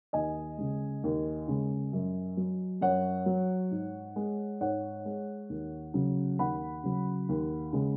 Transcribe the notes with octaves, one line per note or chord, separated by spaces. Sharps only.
D#2 D#5 G#5
C#3 G#3
D#2
C#3 G#3
F#2
F#3
F#2 C#5 F#5
F#3
G#2
G#3
G#2 C#5 F#5
G#3
D#2
C#3 F#3
D#2 F#5 B5
C#3 F#3
D#2
C#3 G#3